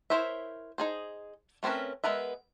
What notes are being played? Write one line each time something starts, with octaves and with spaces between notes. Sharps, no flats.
E4 A#4 C5 C#5 E5
D#4 G#4 C5
A3 C4 C#4 A#4 B4
G#3 B3 A#4 B4 E5